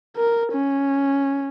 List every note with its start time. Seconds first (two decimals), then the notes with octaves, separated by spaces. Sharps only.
0.17 A#4
0.52 C#4